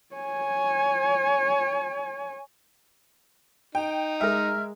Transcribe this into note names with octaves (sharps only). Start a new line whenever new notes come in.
C#5 G#5
D#4 G5
G#3 A#4 E5 F6